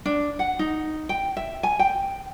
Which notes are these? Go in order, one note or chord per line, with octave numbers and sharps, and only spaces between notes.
D4
F#5
D#4
G5
E5
G#5
G5